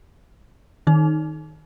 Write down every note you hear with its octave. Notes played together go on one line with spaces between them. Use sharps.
D#3 D#4